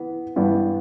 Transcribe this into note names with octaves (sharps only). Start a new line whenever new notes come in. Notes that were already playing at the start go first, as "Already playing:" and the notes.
Already playing: E3 B3
G2 E3 B3 D4